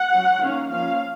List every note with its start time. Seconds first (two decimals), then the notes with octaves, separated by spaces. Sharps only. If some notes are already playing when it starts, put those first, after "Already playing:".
Already playing: F#5
0.12 F#3 C#4
0.41 D#3 A#3 C#4 F5
0.71 F3 A#3 C#4 F5